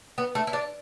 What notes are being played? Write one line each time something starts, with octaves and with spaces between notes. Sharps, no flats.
B3
A3
E4
D4